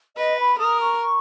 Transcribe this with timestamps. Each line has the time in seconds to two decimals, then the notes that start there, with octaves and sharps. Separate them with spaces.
0.17 B4 D#5
0.38 B5
0.59 A#4 D#6
0.80 C#6